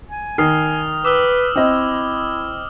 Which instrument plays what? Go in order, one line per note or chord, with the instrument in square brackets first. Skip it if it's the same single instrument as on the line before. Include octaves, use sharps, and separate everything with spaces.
[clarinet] G#5
[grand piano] D#3 C7 [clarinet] G#5 [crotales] D#6 F6
[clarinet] B4 [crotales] D6 E6 G7
[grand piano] C4 D#5 [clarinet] E4